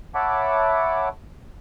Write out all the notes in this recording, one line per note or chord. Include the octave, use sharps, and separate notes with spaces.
C#5 E5 F#5 A5 B5 D6